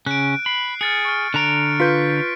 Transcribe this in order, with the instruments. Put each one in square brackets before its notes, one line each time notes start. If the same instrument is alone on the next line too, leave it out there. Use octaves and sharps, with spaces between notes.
[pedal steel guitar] C#3 C#4 [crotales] F#6 D7
[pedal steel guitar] B5 [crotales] C7
[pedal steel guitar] G#4 [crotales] F6 A6 C#7
[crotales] C#6 F6
[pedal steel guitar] D3 A#5 [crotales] F#6 D7
[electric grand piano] F4 B4 G6 [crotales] B6